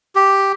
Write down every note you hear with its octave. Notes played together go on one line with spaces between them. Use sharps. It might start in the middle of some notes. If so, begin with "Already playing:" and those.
G4